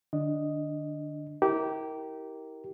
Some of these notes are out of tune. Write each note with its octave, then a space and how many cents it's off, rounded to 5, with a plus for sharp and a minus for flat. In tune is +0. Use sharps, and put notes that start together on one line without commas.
D3 +40 D4 +0 D#5 +0
E4 -40 G4 -15 A#4 +0